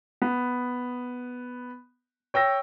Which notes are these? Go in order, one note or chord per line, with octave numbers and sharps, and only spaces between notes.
B3
C#5 G5 E6 A#6